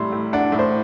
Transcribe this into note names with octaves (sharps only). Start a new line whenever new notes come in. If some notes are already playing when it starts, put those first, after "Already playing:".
Already playing: A2 G3 B5 C6
A2
D4 F#5
A2
C5